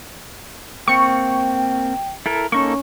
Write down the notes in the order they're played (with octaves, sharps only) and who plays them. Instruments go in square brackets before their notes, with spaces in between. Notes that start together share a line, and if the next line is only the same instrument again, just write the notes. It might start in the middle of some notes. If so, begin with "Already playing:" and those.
[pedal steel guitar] A#3 C4 [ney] G5 [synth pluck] C#6 C#7
[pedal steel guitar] E4 A4 A#4
[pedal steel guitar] A#3 D#4 A4 [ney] C#4 [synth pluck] C#6